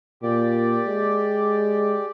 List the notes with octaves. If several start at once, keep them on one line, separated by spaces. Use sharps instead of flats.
A#2 G4 D5
G#3